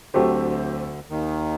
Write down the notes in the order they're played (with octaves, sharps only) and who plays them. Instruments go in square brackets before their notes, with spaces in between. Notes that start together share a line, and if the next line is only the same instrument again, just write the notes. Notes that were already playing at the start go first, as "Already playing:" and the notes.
[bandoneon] D2 D3 [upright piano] F#3 A3 C4 G4 C5
[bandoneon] D#2 D#3